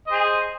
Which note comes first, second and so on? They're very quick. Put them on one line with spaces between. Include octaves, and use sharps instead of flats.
D#5 C5 G#4